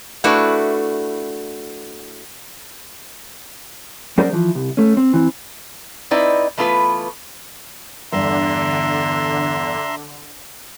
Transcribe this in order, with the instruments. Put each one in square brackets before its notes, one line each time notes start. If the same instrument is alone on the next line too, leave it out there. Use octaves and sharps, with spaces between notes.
[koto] A3 D4 E4 F#4 B4
[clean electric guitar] F#3 C#4 G#4 A#4 C5 D5
E3 F3
C2
A3 C#4
C4
E3 C4
[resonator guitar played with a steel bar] C4 D#4 E4 B4 D5 D#5
E3 A3 B3 F4 B4
[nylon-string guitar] E2 G2 [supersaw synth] D3 [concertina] E5 A#5 C6